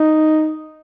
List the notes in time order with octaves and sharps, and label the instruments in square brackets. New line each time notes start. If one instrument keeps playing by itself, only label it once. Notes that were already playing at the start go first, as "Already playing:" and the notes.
Already playing: [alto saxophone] D#4